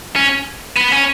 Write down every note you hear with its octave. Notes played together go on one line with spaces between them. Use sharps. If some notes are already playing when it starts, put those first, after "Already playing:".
C#4
B3
C#4